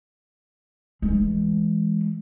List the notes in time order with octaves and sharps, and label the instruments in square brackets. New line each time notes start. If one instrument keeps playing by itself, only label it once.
[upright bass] E3 G#3